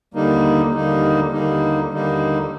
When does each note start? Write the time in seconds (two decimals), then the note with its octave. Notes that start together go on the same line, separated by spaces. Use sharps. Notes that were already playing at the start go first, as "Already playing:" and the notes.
0.14 D#2 D3 G3 A#3 D#4
0.73 D#2 D3 G3 A#3 D#4
1.31 D#2 D3 G3 A#3 D#4
1.91 D#2 D3 G3 A#3 D#4